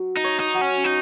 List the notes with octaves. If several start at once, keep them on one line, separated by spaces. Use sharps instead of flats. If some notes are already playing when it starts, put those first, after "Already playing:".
Already playing: F#3
D#4
C#5
D#4
F#3
C#4
C#4 D#4